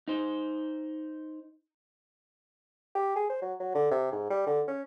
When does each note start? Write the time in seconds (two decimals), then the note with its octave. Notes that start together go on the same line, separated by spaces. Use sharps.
0.08 D#4 C5
2.95 G4
3.16 G#4
3.30 C5
3.42 F#3
3.60 F#3
3.75 D3
3.91 C3
4.12 G#2
4.30 G3
4.47 D3
4.68 C#4